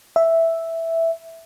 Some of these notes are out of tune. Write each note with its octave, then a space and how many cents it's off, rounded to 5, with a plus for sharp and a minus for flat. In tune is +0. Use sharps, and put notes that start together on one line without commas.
E5 +0